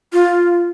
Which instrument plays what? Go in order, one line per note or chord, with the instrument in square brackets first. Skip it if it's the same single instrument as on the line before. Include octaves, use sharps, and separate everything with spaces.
[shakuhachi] F4